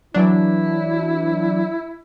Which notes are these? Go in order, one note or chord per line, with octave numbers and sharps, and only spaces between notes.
E3 F#3 D4 E4